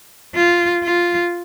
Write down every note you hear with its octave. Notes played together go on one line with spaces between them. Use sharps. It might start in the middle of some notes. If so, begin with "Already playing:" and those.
F4
F4